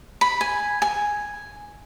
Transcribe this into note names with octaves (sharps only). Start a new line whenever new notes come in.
B5
G#5
G#5